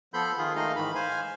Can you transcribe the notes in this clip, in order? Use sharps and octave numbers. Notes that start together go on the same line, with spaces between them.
F3 B3 A4 B5 C6 G6
D#3 F4 G#4
D#3 G#3 A3 D#4 D#5 F5
G#2 D#3 E3 B5
C5 F5 G#5